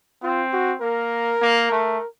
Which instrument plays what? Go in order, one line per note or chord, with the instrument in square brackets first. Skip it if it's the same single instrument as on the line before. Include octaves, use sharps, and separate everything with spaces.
[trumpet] C4 [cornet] F4
[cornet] F#4
[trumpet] A#3 [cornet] A#4
[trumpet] A#3
A3